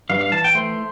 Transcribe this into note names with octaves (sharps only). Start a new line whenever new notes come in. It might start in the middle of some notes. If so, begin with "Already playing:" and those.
G2 F5
F5
E3 A5
G5
A3 C5